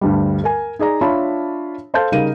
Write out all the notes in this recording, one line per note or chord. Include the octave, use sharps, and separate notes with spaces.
D2 G2 G3
A#4 G#5
D#4 G#4 D5 A#5
D4 F4 C#5 E5 A5 B5
A4 C5 F5 A5 G6
C#3 G3 D#4 A#4 F5 D#7